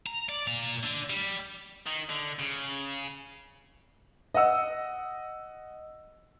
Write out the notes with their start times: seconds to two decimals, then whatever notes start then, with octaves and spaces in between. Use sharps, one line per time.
0.06 A#5
0.29 D5
0.47 A#2 A#5
0.83 D3
1.10 G3
1.87 D#3
2.10 D3
2.39 C#3
4.34 D#5 F#5 E6